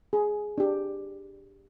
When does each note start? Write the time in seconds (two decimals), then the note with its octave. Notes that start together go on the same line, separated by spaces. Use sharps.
0.13 G#4
0.58 D4 G4